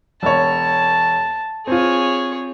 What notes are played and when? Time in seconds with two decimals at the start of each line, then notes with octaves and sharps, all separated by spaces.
0.22 E1 C#5 A5
1.67 C4 F4 G#4 C#5